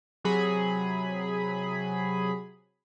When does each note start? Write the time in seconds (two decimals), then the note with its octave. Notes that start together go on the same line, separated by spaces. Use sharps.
0.24 C3 F#3 G#4 B5